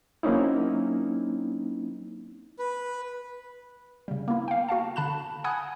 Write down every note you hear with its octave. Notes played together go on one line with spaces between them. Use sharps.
F#3 A#3 C4 C#4 D#4 E4
B4
C#3 G3
A#3 B3 E4
F5 G5
F#4 F5 A5
D3 A5 B5 F#6 E7
F#5 G#5 B5 D#6 F#6 G#6